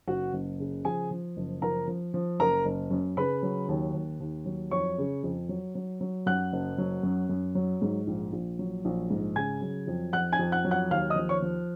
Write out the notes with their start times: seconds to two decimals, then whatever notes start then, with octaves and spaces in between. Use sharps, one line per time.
0.07 F#1 F#4 F#5
0.33 F#1
0.59 C#3
0.85 F3 G#4 G#5
1.11 F3
1.37 F#1
1.62 F3 A#4 A#5
1.88 F3
2.14 F3
2.39 F#1 A#4 A#5
2.65 F#1
2.91 F#2
3.17 C#3 B4 B5
3.43 F#3
3.69 D#2
3.94 D#2
4.20 D#2
4.46 F#3
4.71 F2 C#5 C#6
4.98 C#3
5.24 F2
5.49 F#3
5.75 F#3
6.01 F#3
6.26 F#2 F#5 F#6
6.53 F#1
6.78 F#3
7.03 F#2
7.29 F#2
7.55 F#3
7.82 G#2
8.07 A#1
8.33 A#1
8.59 F#3
8.85 A#1
9.10 G#2
9.36 C#3 G#5 G#6
9.62 F#3
9.87 F2
10.13 F2 F#5 F#6
10.32 G#5 G#6
10.39 F2
10.52 F#5 F#6
10.65 F#3
10.71 F#5 F#6
10.91 D#2 F5 F6
11.10 D#5 D#6
11.16 F3
11.29 C#5 C#6
11.42 F3